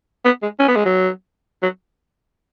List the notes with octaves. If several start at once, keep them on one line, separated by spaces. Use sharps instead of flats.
B3
G#3
C#4
B3
G#3
F#3
F#3